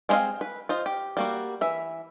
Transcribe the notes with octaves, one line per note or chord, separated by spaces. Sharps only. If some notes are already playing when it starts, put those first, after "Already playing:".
G#3 B3 C4 D#5 F5
B4
F4 C5 D#5
G4
G3 A#3 F#4
E3 E5